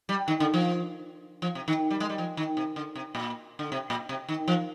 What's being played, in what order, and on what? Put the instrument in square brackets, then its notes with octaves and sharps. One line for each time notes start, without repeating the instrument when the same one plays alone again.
[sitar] G3
D#3
D3
F3
F3
C3
D#3
G3
G#3
G3
F3
D#3
C3
D3
C3
A#2
D3
C3
A#2
C3
D#3
F3